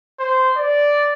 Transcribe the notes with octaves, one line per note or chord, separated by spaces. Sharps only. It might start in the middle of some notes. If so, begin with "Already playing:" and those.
C5
D5